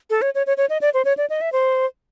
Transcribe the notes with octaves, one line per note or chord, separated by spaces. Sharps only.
A4
C#5
C#5
C#5
C#5
D#5
D5
C5
C#5
D5
D#5
E5
C5